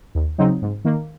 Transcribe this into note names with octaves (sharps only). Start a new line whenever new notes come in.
D#2
C#3 F#3 C4 D#4
G#2
D#3 A#3